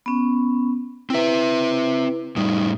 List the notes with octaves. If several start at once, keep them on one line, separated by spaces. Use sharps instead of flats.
B3 C#4
C4 E4 B4 E5
A2 G3 D#4